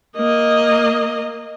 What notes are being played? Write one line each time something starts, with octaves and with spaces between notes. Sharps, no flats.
A#3 D#5